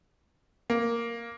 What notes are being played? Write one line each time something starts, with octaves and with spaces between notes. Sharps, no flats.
A#3